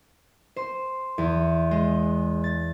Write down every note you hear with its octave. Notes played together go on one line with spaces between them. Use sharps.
C5
E2
G#3
A6